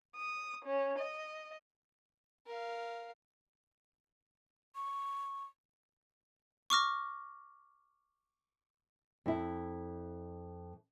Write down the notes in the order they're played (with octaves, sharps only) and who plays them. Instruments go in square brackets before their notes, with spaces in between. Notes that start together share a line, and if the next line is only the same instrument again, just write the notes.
[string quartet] D#6
C#4
D#5
[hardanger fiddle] A#4 F5
[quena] C#6
[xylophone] C#6 D6 F6 A#6
[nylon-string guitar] F2 E4